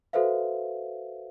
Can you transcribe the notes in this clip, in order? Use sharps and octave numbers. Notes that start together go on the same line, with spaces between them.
F#4 A4 B4 C5 E5 F5